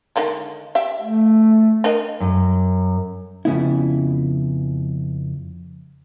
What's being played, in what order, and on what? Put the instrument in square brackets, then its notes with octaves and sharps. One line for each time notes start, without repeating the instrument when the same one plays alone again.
[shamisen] D3 D#3 G#3
G4 E5
[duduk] A3
[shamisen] D4 A#4 D#5
[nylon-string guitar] F#2
[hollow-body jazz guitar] F2 C#3 B3 E4